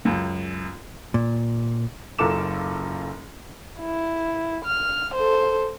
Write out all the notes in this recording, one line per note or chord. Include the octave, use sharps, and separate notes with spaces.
C#2 F#2
A#2
F#1 F#2 F4 A4 D6 E7
E4
F6
A4 C5